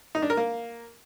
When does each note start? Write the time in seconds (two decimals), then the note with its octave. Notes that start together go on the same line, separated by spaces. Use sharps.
0.15 D#4
0.22 D4
0.30 A#4
0.37 A#3